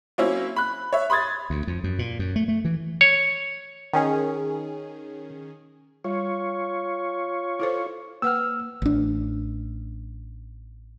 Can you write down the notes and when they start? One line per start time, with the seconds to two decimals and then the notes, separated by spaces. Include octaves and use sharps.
0.18 F#3 A#3 C4 C#4 E4
0.56 B5 F#6
0.93 C#5 E5
1.10 B5 C6 D#6 G#6 A6
1.50 D2
1.67 F2
1.84 F#2
1.99 A#2
2.19 F#2
2.36 A3
2.48 A3
2.65 E3
3.01 C#5
3.93 D#3 C#4 G#4
6.04 G3 F4 C#5
7.59 E4 A4 C5
8.22 A#3 B4 F#5 E6 F6
8.82 A1 D4